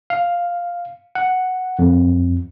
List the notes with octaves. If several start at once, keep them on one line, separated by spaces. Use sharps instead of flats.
F5
F#5
F2